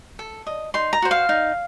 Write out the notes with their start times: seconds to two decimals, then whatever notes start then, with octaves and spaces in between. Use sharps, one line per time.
0.19 A4
0.47 D#5
0.74 D#4 C6
0.93 A#5
1.02 F#4 C5
1.11 F5
1.29 D#4